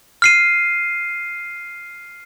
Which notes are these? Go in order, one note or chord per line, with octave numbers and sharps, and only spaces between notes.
F6 C7 D#7